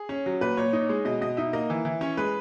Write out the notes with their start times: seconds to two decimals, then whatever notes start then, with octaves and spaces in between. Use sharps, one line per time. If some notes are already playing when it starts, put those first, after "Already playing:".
Already playing: G#4
0.09 C#4
0.26 F#3
0.41 A#2 B4
0.57 A#2 C#5
0.73 D#4 C#5
0.89 G#3
1.05 B2 D#5
1.21 B2 D#5
1.37 D#4 E5
1.53 A#3 D#5
1.70 E3
1.85 E3
2.01 C#4 C#5
2.17 G#3 B4